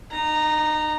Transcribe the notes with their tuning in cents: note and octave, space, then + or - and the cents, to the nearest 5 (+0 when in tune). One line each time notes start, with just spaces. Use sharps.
D#4 -35 A#5 -5